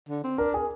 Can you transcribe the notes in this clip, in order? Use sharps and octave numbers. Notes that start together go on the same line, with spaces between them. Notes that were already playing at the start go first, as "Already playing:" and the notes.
D3
C4
D4 A#4
G#4